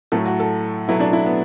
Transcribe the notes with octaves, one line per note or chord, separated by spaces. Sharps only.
A2 F#3 A3 A4
F#4
A4
B2 F#3 A3 E4
D4
E4
B3